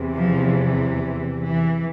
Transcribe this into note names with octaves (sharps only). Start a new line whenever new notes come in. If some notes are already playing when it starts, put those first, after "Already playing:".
Already playing: E2 C3 E3
F3
E3